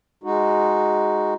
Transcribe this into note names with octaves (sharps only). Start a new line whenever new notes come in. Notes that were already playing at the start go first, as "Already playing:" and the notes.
G#3 D#4 F#4